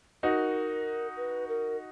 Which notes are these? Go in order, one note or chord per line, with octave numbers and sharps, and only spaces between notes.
D#4 F#4 A#4 B4
B4
A#4